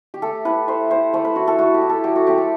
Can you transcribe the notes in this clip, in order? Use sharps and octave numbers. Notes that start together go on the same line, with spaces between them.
G4
A3 A4
E4 B4
A3 C5
E4 C5
A3 C5
B4
E4 F#4
A4
A3 F#4
G4
E4
A4
F#3 G4
F#4
A3 C4 G4
A4